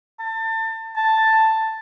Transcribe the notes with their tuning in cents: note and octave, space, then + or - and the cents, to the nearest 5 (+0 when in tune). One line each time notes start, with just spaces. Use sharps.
A5 +30
A5 +5